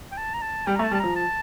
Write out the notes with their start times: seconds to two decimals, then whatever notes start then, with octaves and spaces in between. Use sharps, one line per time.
0.12 G5
0.17 A5
0.34 A#5
0.42 A5
0.67 G3 G5
0.75 A#5
0.79 A3
0.83 A5
0.91 G3
0.95 A5
1.00 F3 A#5
1.16 A5